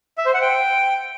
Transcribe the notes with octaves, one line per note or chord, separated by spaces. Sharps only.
E5
C5
F#5
G5